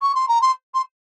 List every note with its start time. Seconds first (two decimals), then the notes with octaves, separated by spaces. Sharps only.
0.02 C#6
0.15 C6
0.28 A#5
0.41 C6
0.74 C6